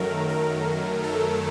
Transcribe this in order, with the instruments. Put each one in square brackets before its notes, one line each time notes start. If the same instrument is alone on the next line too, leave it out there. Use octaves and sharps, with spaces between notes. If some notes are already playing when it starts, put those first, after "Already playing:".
Already playing: [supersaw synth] F#2 D#3 F#3 A3 A#4
A#4
A4